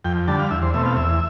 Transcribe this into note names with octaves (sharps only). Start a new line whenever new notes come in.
F2 G5
D3 G3 A5
F5
E2 E5
C5
B2 A3 C4 E5
F5
E2 E5